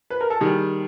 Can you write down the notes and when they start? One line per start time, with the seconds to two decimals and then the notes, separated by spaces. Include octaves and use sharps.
0.10 B4
0.21 A#4
0.30 A4
0.41 D#3 G3 G#4